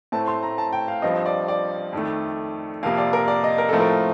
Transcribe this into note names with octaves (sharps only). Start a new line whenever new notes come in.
A2 A3 C4 A5
C6
A#5
A5
G5
F5
G2 F3 C4 D#5
D5
D5
F2 D#3 A3
F2 C3 F3 A#3 F5
D5
A#4
D5
D#5
A#4
A2 F3 A3 C4 A4
A#4